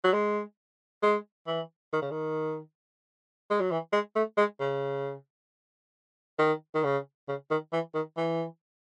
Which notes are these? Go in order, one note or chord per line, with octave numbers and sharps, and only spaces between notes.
F#3
G#3
G#3
E3
D#3
C#3
D#3
G#3
F#3
E3
G#3
A3
G#3
C#3
D#3
D#3
C#3
C#3
D#3
E3
D#3
E3